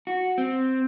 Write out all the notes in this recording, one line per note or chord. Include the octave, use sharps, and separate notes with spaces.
F#4
C4